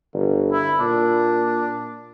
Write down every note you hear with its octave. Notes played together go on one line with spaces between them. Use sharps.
G1
E4
A#2 D4